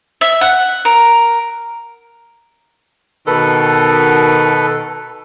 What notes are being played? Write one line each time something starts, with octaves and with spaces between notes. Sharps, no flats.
E5
F#5
A#4
B2 D#3 A4 B4